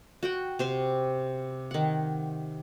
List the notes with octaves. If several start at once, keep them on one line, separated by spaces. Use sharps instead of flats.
F#4 F#5 G5
C3 C5 C6
D#3 F#5